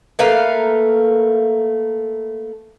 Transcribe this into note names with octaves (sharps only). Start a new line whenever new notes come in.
A3 A#3 B4 F5